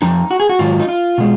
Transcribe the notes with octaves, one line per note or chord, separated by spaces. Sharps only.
F2 F3 D#4
F#4
G#4
F#4
G#2 D#3 F#3 F4
D#4
F4
B2 G#3